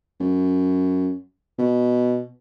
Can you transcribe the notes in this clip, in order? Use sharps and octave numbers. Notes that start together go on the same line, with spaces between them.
F#2
B2